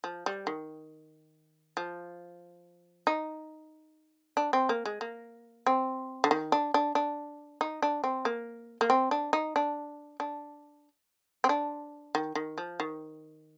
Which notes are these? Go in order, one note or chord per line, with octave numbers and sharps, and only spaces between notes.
F3
G3
D#3
F3
D#4
D4
C4
A#3
G#3
A#3
C4
D3
D#3
D4
D4
D4
D#4
D4
C4
A#3
A#3
C4
D4
D#4
D4
D4
C4
D4
D#3
D#3
F3
D#3